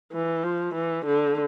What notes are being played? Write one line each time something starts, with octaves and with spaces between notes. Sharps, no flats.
E3
F3
E3
D3